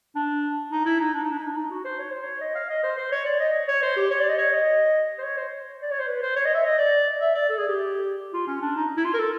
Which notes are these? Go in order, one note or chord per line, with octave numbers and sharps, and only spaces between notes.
D4
D#4
E4
D#4
D4
D#4
D4
D#4
D4
D#4
F#4
C5
C#5
C5
C#5
D#5
F5
D#5
C5
C5
C#5
D5
D#5
C#5
C5
G4
C#5
D5
D#5
C#5
D#5
C5
C#5
C5
D5
C#5
C5
B4
C5
C#5
D#5
E5
D#5
D5
E5
D5
A4
G#4
G4
F4
C#4
D4
D#4
E4
F4
A#4
A4